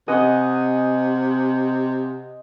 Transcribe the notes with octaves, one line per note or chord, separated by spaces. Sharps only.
C3 D#5 F#5 G#5